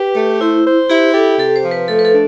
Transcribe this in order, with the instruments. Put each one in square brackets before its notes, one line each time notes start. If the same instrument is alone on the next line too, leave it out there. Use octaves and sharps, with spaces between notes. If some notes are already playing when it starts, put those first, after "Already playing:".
Already playing: [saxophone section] G4 [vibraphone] B4
[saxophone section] A3
[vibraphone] E4 [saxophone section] C5
[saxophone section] C5
[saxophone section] E4 [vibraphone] G4
[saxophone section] G4 [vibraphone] A4
[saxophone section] C3 [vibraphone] A4
[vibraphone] C5
[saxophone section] F3
[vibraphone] B4
[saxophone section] A3 [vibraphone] A4
[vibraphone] B4
A4
[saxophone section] D4